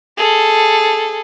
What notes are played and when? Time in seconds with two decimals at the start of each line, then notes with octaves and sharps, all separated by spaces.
0.18 G#4 A4